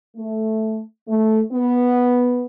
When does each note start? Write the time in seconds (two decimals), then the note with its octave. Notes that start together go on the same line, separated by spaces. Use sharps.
0.17 A3
1.08 A3
1.53 B3